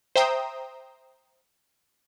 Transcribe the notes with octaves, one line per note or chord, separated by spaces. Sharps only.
C5 E5 G5 A#5 D#6